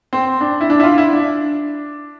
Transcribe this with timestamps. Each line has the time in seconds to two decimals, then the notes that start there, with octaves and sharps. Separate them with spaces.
0.13 C4
0.41 D4
0.61 E4
0.70 D4
0.80 E4
0.83 F4
0.98 E4
1.13 D4